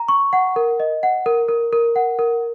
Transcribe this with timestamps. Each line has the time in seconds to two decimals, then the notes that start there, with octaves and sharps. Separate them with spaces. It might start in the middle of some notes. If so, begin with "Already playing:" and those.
Already playing: A#5
0.08 C#6
0.33 F#5
0.56 A#4
0.80 D#5
1.03 F#5
1.26 A#4
1.48 A#4
1.73 A#4
1.96 F#5
2.19 A#4